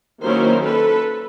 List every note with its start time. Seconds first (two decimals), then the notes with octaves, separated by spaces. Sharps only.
0.25 D#3 F#3 A#3 C#4 E4 A#4 C5
0.63 A4 B4